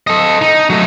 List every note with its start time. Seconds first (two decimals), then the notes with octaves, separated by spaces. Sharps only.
0.07 A4 D#5
0.41 D#4
0.70 F#3 A3